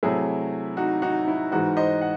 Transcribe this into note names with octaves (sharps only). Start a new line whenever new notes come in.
C3 F#3 A3 E4 G#4
D#4 F#4
D#4 F#4
E4
G#2 E3 G#3 D#4 F#4
C5 D#5
F#5